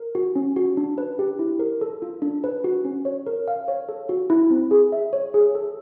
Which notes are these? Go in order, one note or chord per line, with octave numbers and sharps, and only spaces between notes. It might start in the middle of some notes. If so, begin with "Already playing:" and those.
Already playing: A#4
F#4
C#4
F#4
D4
B4
G4
E4
A#4
A4
F4
D4
B4
F#4
C#4
C#5
A#4
F5
C#5
A4
F#4
E4
C4
G#4
E5
C#5
G#4
A4